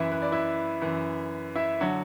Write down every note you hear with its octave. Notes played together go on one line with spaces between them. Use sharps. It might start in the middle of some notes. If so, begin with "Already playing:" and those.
Already playing: F#2 E3 E4 E5
B4
D5
E4 E5
F#2 E3
E4 E5
D3 F#3 F#4 F#5